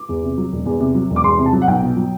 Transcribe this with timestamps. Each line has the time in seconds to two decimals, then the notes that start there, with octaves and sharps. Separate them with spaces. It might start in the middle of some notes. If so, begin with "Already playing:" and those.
Already playing: D6
0.09 E2
0.23 C3
0.38 F#3
0.52 E1
0.66 E2
0.80 C3
0.95 F#3
1.10 E1
1.16 D6
1.24 E2 C6
1.38 C3
1.46 A5
1.53 F#3
1.62 F#5
1.67 B1 G5
1.83 B2
1.97 F#3